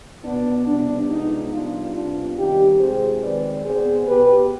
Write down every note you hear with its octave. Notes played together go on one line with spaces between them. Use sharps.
B2 B3 D4
C3 G3 B3 D4
C3 F3 G#3 B3 D#4
C3 G3 B3 D4 F4
C3 G3 B3 D4 F4
D#3 G3 C4 D#4 G4
C3 F3 G#3 C4 G#4 C5
D#3 G#3 C4 B4 D5
B2 B3 G#4 C5
B2 B3 G4 B4